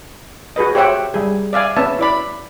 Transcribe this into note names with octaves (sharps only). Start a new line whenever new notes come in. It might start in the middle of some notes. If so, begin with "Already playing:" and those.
F#4 G#4 B4 D#5
G4 C5 C#5 E5 F#5 G5
G3 G#4
D5 E5 F5 G#5
B3 C#4 E5 A5
E4 D5 B5